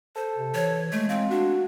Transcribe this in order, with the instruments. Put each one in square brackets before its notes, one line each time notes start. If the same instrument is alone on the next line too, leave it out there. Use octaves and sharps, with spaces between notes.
[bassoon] A4 [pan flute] C5
[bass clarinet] C3
[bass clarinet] E3 [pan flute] C#5
[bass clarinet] G#3 [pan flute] A3
[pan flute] C4 [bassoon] F4
[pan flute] D4 [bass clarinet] F#4